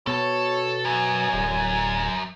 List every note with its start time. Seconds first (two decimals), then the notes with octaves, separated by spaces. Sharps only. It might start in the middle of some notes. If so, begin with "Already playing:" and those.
0.07 B2 A4 C#5 A5
0.85 F#2 G#5
1.34 D1